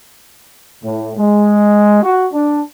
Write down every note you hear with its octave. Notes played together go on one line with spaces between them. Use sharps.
A2
G#3
F#4
D4